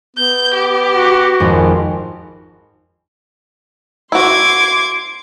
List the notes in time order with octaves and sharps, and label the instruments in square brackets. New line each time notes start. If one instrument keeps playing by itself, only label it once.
[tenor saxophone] B3 [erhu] G6
[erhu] G4
[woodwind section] F#4
[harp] G#1 F2
[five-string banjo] E4 F#4 [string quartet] C6 D6 G#6